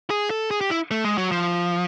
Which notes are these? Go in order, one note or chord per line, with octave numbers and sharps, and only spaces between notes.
G#4
A4
G#4
G4
E4
A3
G#3
F#3
F3